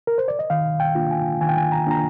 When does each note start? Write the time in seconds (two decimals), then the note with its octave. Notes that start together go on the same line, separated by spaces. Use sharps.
0.07 A#4
0.18 C5
0.28 D5
0.39 D#5
0.50 D#3 F5
0.80 G5
0.95 A#3 D4 F4
1.11 G#5
1.41 D#3 G#5
1.49 G5
1.57 G#5
1.72 A#5
1.86 A#3 D4 F4 A#5